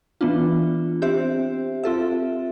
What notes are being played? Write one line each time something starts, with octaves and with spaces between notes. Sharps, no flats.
E3 B3 D4 F4
C4 G4 C5 E5
C4 F4 A4 E5